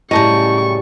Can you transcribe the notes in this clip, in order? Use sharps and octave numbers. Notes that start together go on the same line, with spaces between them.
F#2 A2 C#3 G3 E4 D#5 A5 C#6